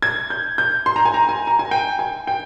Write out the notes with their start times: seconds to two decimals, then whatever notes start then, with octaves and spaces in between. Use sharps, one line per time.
0.02 G#6
0.30 G6
0.58 G6
0.86 C6
0.96 A#5
1.05 G#5
1.14 A#5
1.29 G#5
1.47 A#5
1.59 G#5
1.71 G5
1.99 G#5
2.27 G5